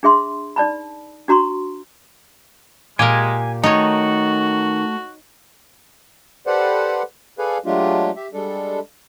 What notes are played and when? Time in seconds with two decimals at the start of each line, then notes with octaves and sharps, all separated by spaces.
0.03 D4 G#4 E5 C6
0.56 D#4 D5 A5 B5
1.28 D4 F#4 A#5 C6 C#6
2.99 A#2 G#3 G4 A#4 G#5
3.64 D#3 A3 D#4 F#4 C#5
6.47 G4 A4 B4 C5 D5 F#5
7.39 G#4 A4 B4 D5 F5 G#5
7.66 F#3 G#3 A3 D4 F4 G4
8.16 G4 E5
8.33 G3 G#3 D4 A4